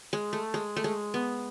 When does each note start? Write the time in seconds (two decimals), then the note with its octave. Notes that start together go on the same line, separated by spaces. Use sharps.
0.13 G#3
0.33 A3
0.54 G#3
0.76 A3
0.84 G#3
1.14 B3